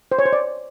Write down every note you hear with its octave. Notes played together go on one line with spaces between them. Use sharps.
C5
C#5
C5
D5